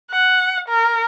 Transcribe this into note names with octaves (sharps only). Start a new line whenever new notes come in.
F#5
A#4